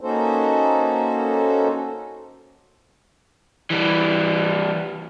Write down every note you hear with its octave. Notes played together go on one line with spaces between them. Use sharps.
A#3 C#4 D#4 F#4 A4 C5
E3 G3